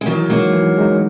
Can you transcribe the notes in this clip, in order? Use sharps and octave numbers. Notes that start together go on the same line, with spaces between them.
G#3
D#3 E3 F#3
F#3 G#3 A#3 D#4
E3
G#3 D#4